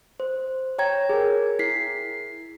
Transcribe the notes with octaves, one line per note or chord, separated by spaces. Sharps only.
C5
C#5 G5 A#5 G#6
G#4 A#4
E4 B6 C7